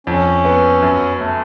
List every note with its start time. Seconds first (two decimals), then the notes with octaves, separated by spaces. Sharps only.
0.07 F2 C#4
0.45 B3
0.82 F#2
1.21 A3